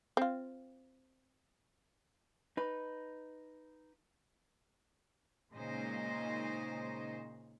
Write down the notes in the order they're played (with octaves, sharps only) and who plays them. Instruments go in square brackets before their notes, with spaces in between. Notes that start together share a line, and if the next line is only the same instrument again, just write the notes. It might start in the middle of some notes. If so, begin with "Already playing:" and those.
[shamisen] C4 F4
[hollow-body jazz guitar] D#4 B4
[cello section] A#2 C#3 G#3 D#4 C5 D#5